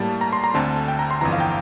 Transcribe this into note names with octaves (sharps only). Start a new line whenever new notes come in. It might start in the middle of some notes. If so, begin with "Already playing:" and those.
Already playing: A2 G3 A#3 A5
A#5
C6
A#5
D2 D3 A3 C4 A5
G5
A#5
C6
G1 F2 E3 A#5
F5
G5